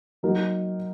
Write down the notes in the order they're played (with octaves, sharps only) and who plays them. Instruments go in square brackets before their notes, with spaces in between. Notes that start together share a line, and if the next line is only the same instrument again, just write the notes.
[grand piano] F#3 A#3 D#4 F#4 A#4